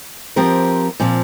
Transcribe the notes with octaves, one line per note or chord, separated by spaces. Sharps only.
F3 C4 G4 A#4
A#2 F3 C4